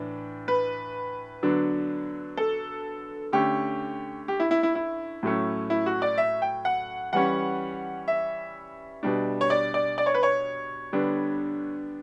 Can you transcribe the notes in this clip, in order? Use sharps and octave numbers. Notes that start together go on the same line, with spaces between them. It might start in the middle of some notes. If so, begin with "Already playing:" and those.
Already playing: A2 E3 D4
B4
D3 F#3 B3 D4
A4
D3 A3 C#4 G4
G4
E4
E4
E4
E4
A2 F#3 A3 C#4
E4
F#4
D5
E5
G5
F#5
E3 G3 C#4 F#5
E5
B2 G3 D4
C#5
D5
D5
D5
C#5
B4
C#5
D3 G3 B3 D4